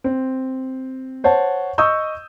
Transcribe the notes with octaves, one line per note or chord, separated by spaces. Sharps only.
C4
C5 C#5 F#5 A5
D#5 C#6 D#6 E6 G6